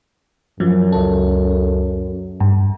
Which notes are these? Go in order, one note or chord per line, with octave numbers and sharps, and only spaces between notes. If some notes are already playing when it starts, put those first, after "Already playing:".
F#2 F3 F#3
C#2 A4
G2